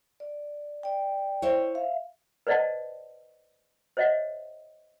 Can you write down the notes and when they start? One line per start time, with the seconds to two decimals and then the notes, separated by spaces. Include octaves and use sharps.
0.20 D5
0.83 D5 G5
1.42 E4 C5 C#5
1.75 E5 F5
2.47 B4 C5 D5 D#5 F#5 A5
3.97 C5 C#5 D#5 E5 F#5